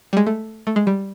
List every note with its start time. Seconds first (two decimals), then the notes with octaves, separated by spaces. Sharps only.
0.13 G3
0.17 G#3
0.27 A3
0.67 A3
0.76 G#3
0.87 G3